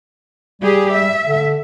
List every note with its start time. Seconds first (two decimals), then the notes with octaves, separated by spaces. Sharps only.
0.61 G3 G4 G#4
0.92 E5
1.27 D3